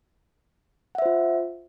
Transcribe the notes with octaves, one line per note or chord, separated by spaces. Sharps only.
F4 C5 E5 F#5